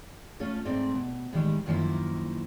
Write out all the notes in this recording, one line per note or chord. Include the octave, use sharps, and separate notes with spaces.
A3 C#4 F4 A4
G#2 A3 C4 D5
B2
A2 D#3 G3 G#3
F#2 D#3 F3 G3 A#3 E4